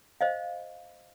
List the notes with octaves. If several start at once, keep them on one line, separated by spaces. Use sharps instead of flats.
C5 D#5 F5